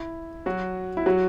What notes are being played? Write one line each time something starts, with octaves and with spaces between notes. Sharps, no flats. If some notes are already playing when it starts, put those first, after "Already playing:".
Already playing: E4
F#3 F#4
E4
F#3 F#4